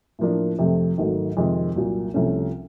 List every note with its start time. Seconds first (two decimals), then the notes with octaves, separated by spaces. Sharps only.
0.19 A2 F3 A#3 D4
0.59 F2 C3 F3 A3
0.98 G#1 G#2 D#3 F#3 A3
1.37 F2 C3 D#3 G#3
1.76 C2 A#2 F#3
2.14 C2 C3 F3 A3 C#4